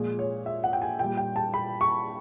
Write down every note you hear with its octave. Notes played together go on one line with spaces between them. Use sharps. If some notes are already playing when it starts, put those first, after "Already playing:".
Already playing: A#2 F3 G#3 G#4
C#5
E5
F#5
G5
G#5
A#2 G3 G5
G5
A5
B5
C#6